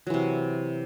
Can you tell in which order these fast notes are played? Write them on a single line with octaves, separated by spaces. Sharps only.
F#3 E3 C3